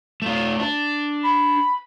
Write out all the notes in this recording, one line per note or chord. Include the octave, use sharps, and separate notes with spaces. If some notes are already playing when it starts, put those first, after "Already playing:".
A3 F4
D4
B5